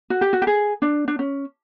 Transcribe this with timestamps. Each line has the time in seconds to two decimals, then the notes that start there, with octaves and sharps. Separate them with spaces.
0.10 F#4
0.21 G4
0.33 F#4
0.42 G4
0.47 G#4
0.82 D4
1.08 D4
1.19 C#4